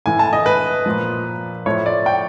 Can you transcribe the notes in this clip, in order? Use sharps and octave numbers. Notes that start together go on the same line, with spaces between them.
A2 E3 G#5
A5
D#5
B4
A#2 F3
A2 F3 C#5
D5
G5